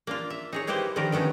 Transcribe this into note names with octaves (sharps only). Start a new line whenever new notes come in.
A#3 D4 F4
E5
D#4 G#4 C#5
A#3 D#4 E4 G4 B4 C5
D3 D#3 F3 A3 G4 A#4
D#3 A3 B3 C#4 D#4